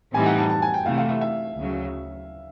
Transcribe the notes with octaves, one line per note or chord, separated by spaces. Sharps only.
A2 E3 G3 C4 D#4 G#5
F#5
A5
A5
G#5
G5
C3 E3 A3 F5
F5
E5
E5
D2 C#3 F#3